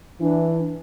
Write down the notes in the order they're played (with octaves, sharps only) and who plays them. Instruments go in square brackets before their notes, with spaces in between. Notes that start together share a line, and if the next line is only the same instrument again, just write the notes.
[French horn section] E3 [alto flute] D4